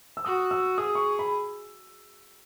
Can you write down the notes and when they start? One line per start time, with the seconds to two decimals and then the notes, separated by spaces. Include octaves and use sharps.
0.17 E6
0.25 F#4 D#6
0.51 E6
0.78 G#4 D#6
0.95 C#6
1.19 B5